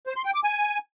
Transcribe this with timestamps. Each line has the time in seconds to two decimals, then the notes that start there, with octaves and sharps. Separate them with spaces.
0.07 C5
0.16 C6
0.25 G5
0.34 D6
0.44 G#5